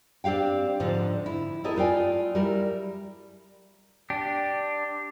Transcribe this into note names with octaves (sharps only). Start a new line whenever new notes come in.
C4 D4 G4 F5 G5
G#2 D3 F3
E4
C4 E4 G4 A4 A#4 D#5
A3 F4 D5 G5 G#5
G3 E4 A#4
D4 G4